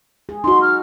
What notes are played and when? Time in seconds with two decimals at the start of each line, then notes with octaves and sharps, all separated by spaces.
0.29 G#4
0.44 D#4 F#4 C6
0.62 F6